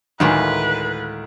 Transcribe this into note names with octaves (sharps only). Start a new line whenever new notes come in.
D2 A2 D#3 G#3 A#3 B4